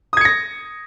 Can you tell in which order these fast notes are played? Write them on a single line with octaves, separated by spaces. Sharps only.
D#6 G#6 C#7 A#6